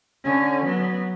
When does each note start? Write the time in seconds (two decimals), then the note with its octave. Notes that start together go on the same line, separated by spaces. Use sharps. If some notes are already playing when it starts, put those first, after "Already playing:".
0.24 D3 C#4
0.64 F#3 B3